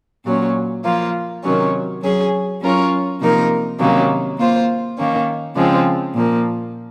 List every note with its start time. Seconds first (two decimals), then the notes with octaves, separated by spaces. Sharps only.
0.26 A#2 F#3 C#4
0.84 F3 A#3 F4
1.43 C3 D#3 F#3 C#4
2.02 F#3 C#4 G#4
2.61 F#3 C#4 F4 A#4 C#5
3.21 C3 F3 A#3 D#4 A#4
3.79 C3 D#3 F#3 A#3 C#4
4.38 A#3 F4 C5
4.98 D#3 A#3 C#4
5.56 C#3 F3 G#3 C4
6.15 A#2 F3 A#3